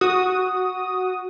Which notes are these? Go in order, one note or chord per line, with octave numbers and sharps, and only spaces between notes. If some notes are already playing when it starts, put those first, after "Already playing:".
F#4 D#6